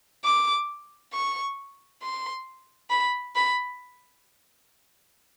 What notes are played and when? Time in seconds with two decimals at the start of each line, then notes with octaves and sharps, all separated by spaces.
0.25 D6
1.13 C#6
2.02 C6
2.90 B5
3.36 B5